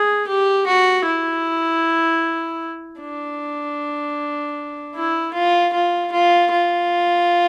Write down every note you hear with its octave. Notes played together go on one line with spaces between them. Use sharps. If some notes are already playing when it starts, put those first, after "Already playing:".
Already playing: G#4
G4
F#4
E4
D4
E4
F4
F4
F4
F4